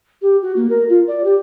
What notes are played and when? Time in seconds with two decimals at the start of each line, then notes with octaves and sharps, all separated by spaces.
0.22 G4
0.42 F#4
0.56 A#3
0.70 A#4
0.89 F4
1.08 D5
1.24 G4